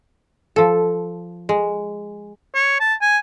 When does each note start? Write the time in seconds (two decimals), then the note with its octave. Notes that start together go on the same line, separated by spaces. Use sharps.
0.56 F3 A4
1.49 G#3
2.55 C#5
2.80 A5
3.01 G#5